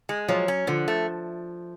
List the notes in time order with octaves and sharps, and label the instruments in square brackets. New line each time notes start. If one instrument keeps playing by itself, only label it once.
[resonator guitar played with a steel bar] G#3
[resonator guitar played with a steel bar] F3 [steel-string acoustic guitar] F#3
[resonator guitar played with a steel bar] C#4
[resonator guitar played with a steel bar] D3 [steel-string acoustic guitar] F3
[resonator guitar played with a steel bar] A3